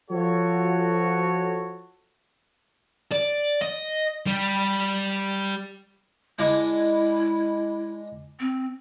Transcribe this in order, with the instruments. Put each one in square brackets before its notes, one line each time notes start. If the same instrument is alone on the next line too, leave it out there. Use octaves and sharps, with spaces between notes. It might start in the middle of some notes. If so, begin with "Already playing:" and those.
[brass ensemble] F3 F#4 A4 C#5
[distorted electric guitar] D5
D#5
G3
[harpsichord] G#3 D4 [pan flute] E4
[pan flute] C4